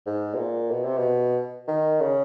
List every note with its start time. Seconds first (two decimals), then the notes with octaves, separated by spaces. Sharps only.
0.06 G#2
0.34 B2
0.38 A#2
0.71 B2
0.85 C3
0.98 B2
1.68 D#3
2.01 C#3